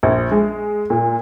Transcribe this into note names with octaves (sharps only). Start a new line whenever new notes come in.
A#1
G#3
A#2